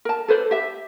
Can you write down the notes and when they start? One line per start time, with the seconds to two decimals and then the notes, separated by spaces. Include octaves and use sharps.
0.05 A#4 A5
0.28 A4 B4 C5 D5
0.51 G4 E5